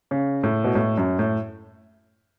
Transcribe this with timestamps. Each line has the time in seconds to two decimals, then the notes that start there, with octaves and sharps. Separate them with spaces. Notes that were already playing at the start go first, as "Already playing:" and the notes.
0.11 C#3
0.44 A2
0.64 B2
0.75 A2
0.97 F#2
1.19 A2